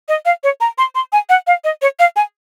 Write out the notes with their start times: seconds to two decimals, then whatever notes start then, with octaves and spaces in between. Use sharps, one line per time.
0.09 D#5
0.25 F5
0.44 C#5
0.61 A#5
0.78 C6
0.95 C6
1.13 G#5
1.29 F#5
1.47 F5
1.64 D#5
1.82 C#5
1.99 F5
2.16 G#5